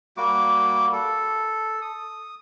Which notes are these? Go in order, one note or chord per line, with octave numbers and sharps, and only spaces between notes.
G3 A#3 F#4 D6
A4
D#6